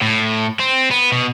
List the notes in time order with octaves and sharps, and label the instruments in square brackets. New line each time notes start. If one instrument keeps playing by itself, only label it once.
[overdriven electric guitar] A2
C4
B3
B2